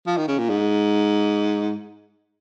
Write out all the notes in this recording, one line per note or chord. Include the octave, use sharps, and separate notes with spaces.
F3
D#3
C#3
A#2
G#2